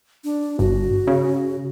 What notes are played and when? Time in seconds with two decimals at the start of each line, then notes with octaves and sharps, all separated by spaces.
0.24 D4
0.59 G1 F#4
1.07 C#3